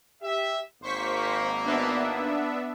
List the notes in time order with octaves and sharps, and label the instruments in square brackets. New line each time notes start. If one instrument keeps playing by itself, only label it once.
[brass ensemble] G4 E5
[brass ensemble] G#1 A#3 [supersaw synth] C5 C#6 B6
[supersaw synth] B3 D4 E5